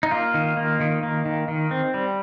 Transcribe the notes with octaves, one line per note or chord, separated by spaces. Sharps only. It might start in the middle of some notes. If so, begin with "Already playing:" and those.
D#4
A#3 F4
D#3
A#3
D#3
A#3
D#3
D#3
C4
G3